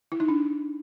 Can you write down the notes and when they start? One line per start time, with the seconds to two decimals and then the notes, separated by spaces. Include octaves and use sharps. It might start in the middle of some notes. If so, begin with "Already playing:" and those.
0.12 E4
0.20 D#4
0.28 D4